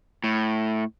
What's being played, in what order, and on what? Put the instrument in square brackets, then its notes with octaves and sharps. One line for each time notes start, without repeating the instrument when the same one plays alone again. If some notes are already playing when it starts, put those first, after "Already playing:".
[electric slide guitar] A2